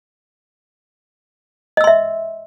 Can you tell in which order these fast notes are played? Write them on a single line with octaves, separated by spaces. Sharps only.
D#5 E6 C6 E5